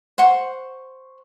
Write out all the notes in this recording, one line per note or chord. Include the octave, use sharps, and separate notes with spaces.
C5 F#5 C#6